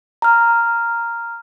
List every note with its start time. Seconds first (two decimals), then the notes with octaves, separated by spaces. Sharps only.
0.22 A#5 F6